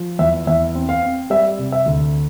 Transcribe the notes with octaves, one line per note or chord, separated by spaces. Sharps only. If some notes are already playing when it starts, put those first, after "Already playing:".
Already playing: F3
E2 E5
E2 E5
C4
F5
C4
G3 E5
C3
E5
D2